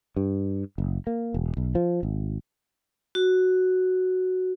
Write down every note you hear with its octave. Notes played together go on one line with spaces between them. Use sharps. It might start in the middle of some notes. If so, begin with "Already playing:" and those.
G2
F#1
A#3
E1
B1
F3
G#1
F#4